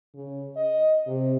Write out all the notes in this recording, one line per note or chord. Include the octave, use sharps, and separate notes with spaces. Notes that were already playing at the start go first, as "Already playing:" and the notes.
C#3
D#5
C3